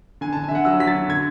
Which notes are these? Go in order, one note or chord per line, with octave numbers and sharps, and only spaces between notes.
D3 G#5
D3 A5
E5 G#5
D3 F#5
F#3 E6
F#3 B6
A6
D3
D3 G#6